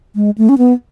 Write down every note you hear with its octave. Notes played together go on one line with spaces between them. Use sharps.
G#3
A3
C#4
B3